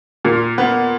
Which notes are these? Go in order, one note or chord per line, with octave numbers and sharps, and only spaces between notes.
A#2
B3